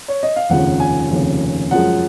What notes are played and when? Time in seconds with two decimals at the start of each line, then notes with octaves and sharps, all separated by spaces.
0.08 C#5
0.23 D#5
0.36 F5
0.50 F1 D#2 C#3 F3 F#5
0.80 G#5
1.10 F1 D#2 C#3 F3
1.71 F#2 F3 G#3 F#5